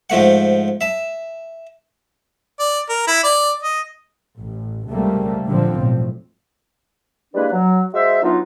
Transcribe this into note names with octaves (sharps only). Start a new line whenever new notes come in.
G#2 F3 A3 F#5
E5 A5
D5
A#4
E4
D5
D#5
A1
C#2 C3 G3 A3 A#3
A#2 D3 F3 G3 C4
B1 A2
G3 G#3 A#3 D4 E4 B4
F#3
G#3 F#4 C5 E5
F#3 B3 D4 D#4 F4